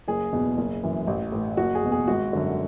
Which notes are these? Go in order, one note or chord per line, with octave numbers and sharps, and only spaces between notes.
F#1 G#4
E2 B2
F#1
F#2 E3
A1
A2 E3
F#1 F#4
G#4
E2 B2
G#4
G#1 F#4
F#2 D3